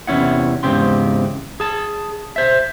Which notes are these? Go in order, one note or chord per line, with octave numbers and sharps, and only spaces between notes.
E2 C3 C#4 E4 F#5
E2 G#2 C#3 C4 G4 C6
G#4 A5
C5 E5